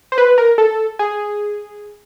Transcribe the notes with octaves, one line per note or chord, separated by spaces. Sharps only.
C5
B4
A#4
A4
G#4